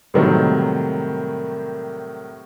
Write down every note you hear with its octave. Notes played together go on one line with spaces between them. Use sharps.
A2 C3 D#3 F#3 G3 A#3